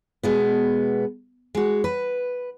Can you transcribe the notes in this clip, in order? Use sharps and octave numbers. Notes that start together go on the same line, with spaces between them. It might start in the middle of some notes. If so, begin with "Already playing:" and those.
B2 G#3 B3
G#3 F#4
B4